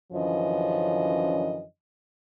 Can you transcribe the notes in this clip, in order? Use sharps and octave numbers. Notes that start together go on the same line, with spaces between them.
F#2 D3 E3 F3 C#4 D#5